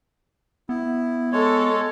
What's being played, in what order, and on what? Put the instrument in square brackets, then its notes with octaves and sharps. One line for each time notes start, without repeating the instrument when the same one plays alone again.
[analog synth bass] B3 [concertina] E4
[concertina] G#3 C#5 [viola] A4